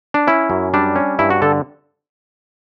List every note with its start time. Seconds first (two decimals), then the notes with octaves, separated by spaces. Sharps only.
0.14 D4
0.27 C#4 E4
0.50 F#2
0.74 G3 D4
0.96 C#4
1.19 G2 E4
1.30 F#4
1.42 D3 A4